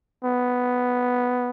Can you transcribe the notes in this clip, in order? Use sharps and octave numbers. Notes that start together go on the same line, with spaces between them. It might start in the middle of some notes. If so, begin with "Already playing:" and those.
B3